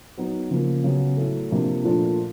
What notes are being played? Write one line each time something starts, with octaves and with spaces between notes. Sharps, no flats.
F#3 B3 D#4
C#3 F3 A#3
C#3 F#3 B3
A2 F#3 A3
C3 F3 A#3 D4 F4
A#2 F3 A3 D4